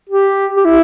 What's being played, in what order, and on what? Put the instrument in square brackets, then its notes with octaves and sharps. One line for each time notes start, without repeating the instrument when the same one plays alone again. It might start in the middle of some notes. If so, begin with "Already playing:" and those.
[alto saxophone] G4
G4
E4